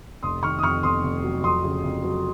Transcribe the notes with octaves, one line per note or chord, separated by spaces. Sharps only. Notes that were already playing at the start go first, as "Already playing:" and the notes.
F1 C6 D#6
D#3 C#6 F6
D#6
F2 C#6 F6
F2 C6 D#6
F1
F#3
F2 C6 D#6
C#3
F2
F#3